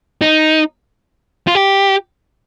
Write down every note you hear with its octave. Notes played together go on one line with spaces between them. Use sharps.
D#4
F4
G4